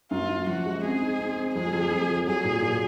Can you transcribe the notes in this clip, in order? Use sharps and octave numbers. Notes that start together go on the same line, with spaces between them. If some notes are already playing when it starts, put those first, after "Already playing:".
F#2 F4
F#2
F3 F#4
G#3
C4 G#4
D#4
C4
C4
F2 G#4
F2
F2
F2
F#3 G#4
A#2
A#2